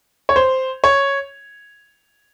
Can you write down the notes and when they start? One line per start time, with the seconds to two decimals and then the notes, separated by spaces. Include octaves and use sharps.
0.29 C#5
0.36 C5
0.84 C#5